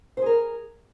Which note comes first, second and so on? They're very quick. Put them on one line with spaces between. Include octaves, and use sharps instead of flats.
C5 G#4 A#4